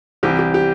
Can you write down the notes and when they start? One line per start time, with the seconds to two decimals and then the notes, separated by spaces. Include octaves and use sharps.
0.23 C2 C3 E3 G4
0.39 G4
0.54 G4